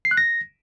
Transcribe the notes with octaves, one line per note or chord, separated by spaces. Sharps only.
C7
F#6
A#6